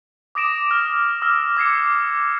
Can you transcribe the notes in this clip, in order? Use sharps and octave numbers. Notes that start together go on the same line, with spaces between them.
D6 D#6 A#6 D7 E7
F6
D6 E6 F6 A#6
D6 G#6 C7 C#7